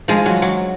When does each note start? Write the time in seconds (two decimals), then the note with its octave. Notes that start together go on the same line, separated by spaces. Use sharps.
0.08 F3 G#3
0.26 F#3
0.42 F#3